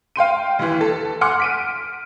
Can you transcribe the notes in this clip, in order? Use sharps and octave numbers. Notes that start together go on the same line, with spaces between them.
F5 G5 C6 D#7
D#2 E3
A4
F#5 G#5 C6 D6 F6 C#7
B6 D7 D#7